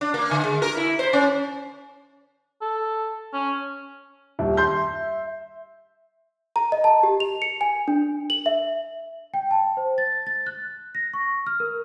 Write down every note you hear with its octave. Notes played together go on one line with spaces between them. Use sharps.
D4
A#3
D3
G#3
A#4
E4
C5
C#4
A4
C#4
D#1 E5
C6 G6
A#5
D#5
A5
G4
F7
C#7
G#5
D4
F#7
E5
G5
A5
C5
A6
A6
F#6
A#6
C#6
F6
A#4